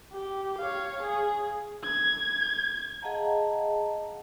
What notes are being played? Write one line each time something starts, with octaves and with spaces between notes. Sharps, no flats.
G4
C#5 F5
G#4
G#6
G#4 D#5 F5 F#5 A5 A#5